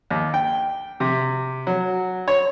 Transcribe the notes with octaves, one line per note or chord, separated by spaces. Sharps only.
D#2
G5
C3
F#3
C#5